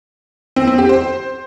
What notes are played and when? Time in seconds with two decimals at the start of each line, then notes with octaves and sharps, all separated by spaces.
0.56 C4
0.67 C4
0.78 G4
0.89 C5